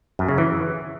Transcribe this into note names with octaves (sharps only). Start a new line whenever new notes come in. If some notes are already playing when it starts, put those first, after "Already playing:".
F#2
C#3
E3